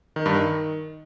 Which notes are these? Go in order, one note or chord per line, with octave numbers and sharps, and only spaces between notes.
D#3
G2
D#3